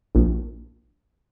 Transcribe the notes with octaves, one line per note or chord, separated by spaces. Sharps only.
A#1